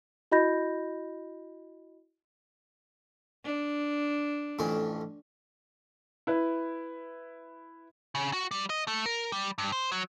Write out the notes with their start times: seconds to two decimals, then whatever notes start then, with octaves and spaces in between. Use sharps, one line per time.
0.32 E4 F#4 D#5 B5 G6 A#6
3.45 D4
4.59 A1 F2 C#4
6.27 E4 B4
8.15 C#3
8.33 F#4
8.51 G3
8.70 D#5
8.88 A3
9.06 A#4
9.32 G3
9.58 G2
9.72 C5
9.92 F#3